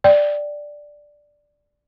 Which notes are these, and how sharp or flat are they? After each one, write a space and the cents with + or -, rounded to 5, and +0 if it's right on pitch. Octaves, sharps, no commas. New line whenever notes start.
D5 +0 G5 +0